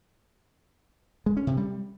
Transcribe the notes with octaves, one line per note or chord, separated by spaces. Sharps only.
G#3
C#4
C3
G3